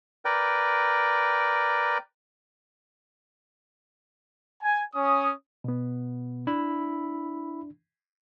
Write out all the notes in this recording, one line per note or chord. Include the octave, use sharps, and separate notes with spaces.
A#4 B4 D5 G5
G#5
C#4 D#6
B2 B3
D4 E4 E5 B5